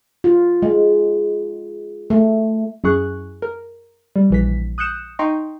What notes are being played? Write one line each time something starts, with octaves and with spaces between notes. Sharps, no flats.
F4
G#3
A3
F#2 E4 G#4 C#6 F#6
A#4
G3
A#1 E3 B6
D#6 F#6 G6 C#7 E7
D#4 D#5 G5 A#5 C6 C#6